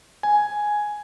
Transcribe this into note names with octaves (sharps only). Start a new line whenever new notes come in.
G#5